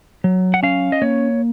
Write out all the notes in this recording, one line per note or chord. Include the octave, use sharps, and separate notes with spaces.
F#3
F#5
C#4 F5
D#5
A#3 C#5